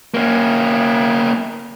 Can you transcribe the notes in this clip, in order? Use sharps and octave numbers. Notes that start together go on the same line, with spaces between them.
A#3 C#4